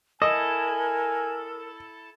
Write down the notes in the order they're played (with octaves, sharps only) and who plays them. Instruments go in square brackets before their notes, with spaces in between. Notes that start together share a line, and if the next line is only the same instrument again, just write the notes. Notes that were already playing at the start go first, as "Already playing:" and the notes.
[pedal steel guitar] E4 A4 [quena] A#4 [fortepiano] D#5 [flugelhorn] G#5